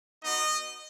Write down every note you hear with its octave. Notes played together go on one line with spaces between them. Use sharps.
B3 D#4 F#4 D#5